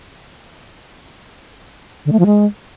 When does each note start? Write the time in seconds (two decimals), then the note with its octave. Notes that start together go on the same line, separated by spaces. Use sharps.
2.06 D3
2.12 A3
2.19 F3
2.26 G#3